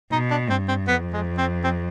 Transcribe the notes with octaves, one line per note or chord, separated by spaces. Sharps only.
B2 D#4
D4
G2 C4
C4
F2 B3
G#3
C4
C4